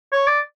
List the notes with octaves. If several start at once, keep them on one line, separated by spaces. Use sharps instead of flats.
C#5
D5